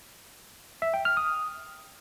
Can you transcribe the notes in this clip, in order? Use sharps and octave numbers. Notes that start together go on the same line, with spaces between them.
E5
G5
F6
D#6